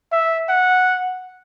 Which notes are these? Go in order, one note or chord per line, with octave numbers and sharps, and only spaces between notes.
E5
F#5